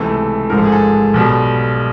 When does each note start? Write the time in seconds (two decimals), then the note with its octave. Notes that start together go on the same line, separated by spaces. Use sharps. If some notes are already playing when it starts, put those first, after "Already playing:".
Already playing: C#2 C3 E3 A3
0.50 A1 G#2 F3 A#4
0.58 A4
0.65 G#4
0.72 A4
1.14 B1 B2 G3